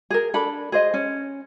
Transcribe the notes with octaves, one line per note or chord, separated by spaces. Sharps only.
G#4 A#4
D4 A4 B5
G#4 C5 D#5
C#4